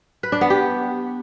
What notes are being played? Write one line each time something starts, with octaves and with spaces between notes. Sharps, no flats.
B4
D4
B3
G4